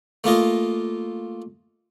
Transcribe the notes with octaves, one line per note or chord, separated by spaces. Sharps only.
A3 A#3 F4 D#5